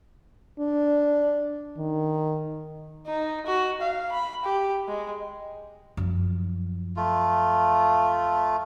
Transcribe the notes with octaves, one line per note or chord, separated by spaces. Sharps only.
D4
D#3
D#4
F#4
F5
B5
G4
G#3
F#2 F3
A3 F4